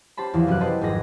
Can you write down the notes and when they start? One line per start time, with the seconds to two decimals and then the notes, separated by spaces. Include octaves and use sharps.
0.17 C#4 G4 C5 A5 B5
0.34 E2 E3 F3
0.47 F#2 C3 C#4 F#4 G4 F#6
0.60 G4 A4 B4 C5 D#5
0.81 G#1 F2 G#4 B4 A#6